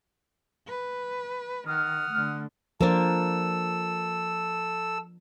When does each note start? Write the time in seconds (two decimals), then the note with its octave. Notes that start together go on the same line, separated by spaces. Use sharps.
0.68 B4
1.68 D#3 F#5 D#6 F6
2.11 D3 A3
2.81 F3 A#3 D4 A4 C5 E6